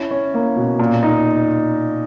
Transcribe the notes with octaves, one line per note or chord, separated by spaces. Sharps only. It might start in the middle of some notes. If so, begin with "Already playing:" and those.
Already playing: C#4 E4
C#4
A#3
B2
A#2
D#4